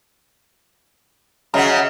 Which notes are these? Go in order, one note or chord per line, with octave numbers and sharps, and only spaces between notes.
C#3 F#3 D#5 E5 A#5